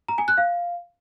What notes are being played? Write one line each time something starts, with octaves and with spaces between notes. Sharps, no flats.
A#5
G#5
F#6
F5